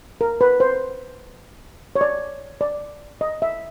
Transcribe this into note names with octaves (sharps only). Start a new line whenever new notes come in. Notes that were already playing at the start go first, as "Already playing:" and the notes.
A#4
B4
C5
C#5
D5
D5
D#5
E5